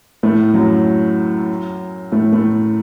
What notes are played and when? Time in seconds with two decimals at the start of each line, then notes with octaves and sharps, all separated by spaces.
0.23 A2 A3
0.54 F#2 F#3
2.12 A2 A3
2.33 A2 A3